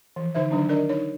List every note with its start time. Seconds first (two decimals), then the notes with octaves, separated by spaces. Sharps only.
0.16 E3 F3
0.35 D3 D#4 C5 E5
0.51 D3 D#3 F#3 D4 D#4
0.69 D4 A#4 D5 D#5
0.89 D#4 C#5